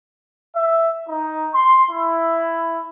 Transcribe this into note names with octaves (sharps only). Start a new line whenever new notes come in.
E5
D#4
C6
E4